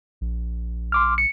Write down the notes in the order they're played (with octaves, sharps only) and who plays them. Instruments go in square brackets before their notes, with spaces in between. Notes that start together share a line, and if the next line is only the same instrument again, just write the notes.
[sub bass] A#1
[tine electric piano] C6 D6 F6
C#7